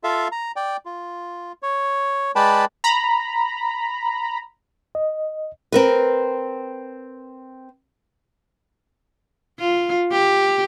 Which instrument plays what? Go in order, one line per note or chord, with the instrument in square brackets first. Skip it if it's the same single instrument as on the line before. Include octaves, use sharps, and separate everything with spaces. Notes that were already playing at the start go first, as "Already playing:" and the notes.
[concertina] F4 A4 E5 F5
A#5
D5 G5
F4
C#5
G#3 B4 D5 G5 A5 B5
[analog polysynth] A#5 B5
[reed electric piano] D#5
[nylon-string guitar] C4 A#4 B4
[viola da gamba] F4
G4